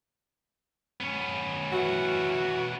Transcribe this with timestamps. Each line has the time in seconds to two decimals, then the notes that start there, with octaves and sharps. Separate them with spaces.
1.00 B3 C#4
1.72 E3 F#4